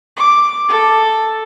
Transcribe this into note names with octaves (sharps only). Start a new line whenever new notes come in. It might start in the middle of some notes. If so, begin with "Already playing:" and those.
D6
A4